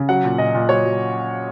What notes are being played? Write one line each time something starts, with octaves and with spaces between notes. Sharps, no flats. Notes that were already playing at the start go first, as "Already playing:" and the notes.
Already playing: C#3
F#3 F#5
A#2
A#2 D#5
A#2
F#3 C#5
F#3